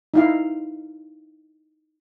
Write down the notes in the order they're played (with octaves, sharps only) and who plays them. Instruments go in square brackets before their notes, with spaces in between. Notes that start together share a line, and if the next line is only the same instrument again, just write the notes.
[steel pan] D#4 E4 F5